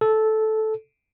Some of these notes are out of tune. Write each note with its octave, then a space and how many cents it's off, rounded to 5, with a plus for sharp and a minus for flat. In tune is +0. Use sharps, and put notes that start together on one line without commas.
A4 -10